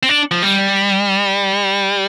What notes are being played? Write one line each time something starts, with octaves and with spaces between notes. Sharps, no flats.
C4
D4
F3
G3